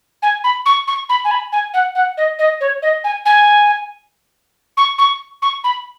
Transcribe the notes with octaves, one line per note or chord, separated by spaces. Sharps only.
G#5
B5
C#6
C#6
B5
G#5
B5
G#5
F#5
F#5
D#5
D#5
C#5
D#5
G#5
G#5
C#6
C#6
C#6
B5